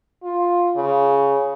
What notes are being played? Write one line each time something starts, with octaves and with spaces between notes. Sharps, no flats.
F4
C#3